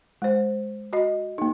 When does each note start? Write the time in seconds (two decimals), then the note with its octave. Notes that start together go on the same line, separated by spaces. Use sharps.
0.22 G#3 C5
0.93 F#4 D#5
1.38 A#3 D#4